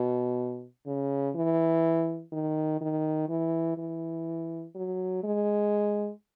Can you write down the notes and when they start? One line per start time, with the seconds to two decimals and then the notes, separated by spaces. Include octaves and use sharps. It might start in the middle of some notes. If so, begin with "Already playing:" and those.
Already playing: B2
0.86 C#3
1.35 E3
2.32 D#3
2.81 D#3
3.29 E3
3.77 E3
4.75 F#3
5.23 G#3